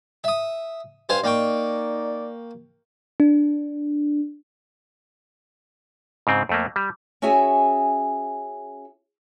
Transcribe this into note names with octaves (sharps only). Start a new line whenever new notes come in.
E5 D#6
G2 C5 F5 G#5
A#3 D#4 D5 G5 C#6
D4
G#2 C#3 C4
F2 A3 A#3
G3
C#4 F#4 G#4 E5 G#5